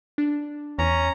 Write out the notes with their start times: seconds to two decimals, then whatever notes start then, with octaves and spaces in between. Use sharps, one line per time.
0.18 D4
0.79 E2 C#4 A#5